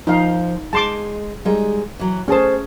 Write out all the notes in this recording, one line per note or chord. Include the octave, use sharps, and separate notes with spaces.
F3 D#4 F4 F5
G#3 A5 C6 D6
G3 G#3 D#4
E3 F#3
A3 C#4 G#4 C5 A5